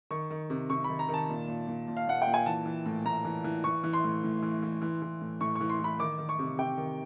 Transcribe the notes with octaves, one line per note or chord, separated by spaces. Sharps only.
D#3 C#6
D#3
C3
C3 C#6
D#3 B5
A#5
D#3
A5
A#2
A#2
A#2
A#2
F5
A#2 F#5
G5
A#2
G#5
E3 A5
E3
A2
A2 A#5
E3
E3
E3 C#6
E3
C6
A2
A2
E3
E3
E3
E3
A2
A2 C#6
C#6
E3
C6
E3 B5
D#3 D6
D#3
C#6
C3
C3 G5
D#3